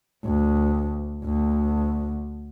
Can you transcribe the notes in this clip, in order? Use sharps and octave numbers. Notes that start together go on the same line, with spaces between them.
D2
D2